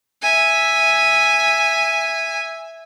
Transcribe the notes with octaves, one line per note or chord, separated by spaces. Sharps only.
E5 G#5